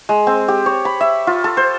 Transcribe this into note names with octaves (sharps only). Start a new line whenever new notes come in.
G#3
C4
G4
C#5
B5
E5
F4
A4
C5